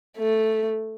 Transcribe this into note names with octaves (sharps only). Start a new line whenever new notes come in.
A3